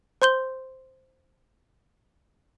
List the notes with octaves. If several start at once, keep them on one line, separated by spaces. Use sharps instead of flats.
C5 C6 G6 G7